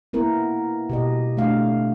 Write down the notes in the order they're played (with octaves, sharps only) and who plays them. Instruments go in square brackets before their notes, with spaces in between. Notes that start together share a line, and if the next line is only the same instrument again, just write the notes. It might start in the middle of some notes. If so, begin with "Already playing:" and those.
[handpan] A#3 B3 E4 A#4
B2 G4 D#5
A3 D4 F5